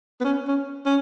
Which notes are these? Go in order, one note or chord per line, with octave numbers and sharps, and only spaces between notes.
B3
C#4
C#4
C#4